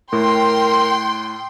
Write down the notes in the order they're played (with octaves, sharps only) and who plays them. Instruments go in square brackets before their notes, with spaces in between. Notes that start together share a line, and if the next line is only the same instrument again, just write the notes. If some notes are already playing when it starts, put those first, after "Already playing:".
[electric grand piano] A2 [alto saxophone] A#4 [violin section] G5 C6